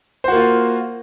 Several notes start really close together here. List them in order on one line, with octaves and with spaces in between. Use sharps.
C5 F#4 A#3 F4